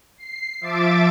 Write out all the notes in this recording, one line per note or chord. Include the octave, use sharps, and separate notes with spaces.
C7
F3 E5 D6 A6 D7